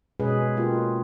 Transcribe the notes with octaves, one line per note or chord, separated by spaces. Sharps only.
B2 G#3 C#4 G#4 B4
A#3 F4 G4